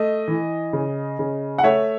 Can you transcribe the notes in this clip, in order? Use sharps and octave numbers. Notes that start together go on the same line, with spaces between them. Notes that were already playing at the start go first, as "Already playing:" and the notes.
Already playing: A3 D#5
E3
C#3
C#3
F#5
A3 C#5 E5